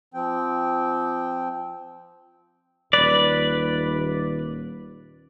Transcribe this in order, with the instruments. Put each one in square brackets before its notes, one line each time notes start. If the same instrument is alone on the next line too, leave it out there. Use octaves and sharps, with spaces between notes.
[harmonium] F3 C4 G5
[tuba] D#1 [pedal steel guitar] B4 D5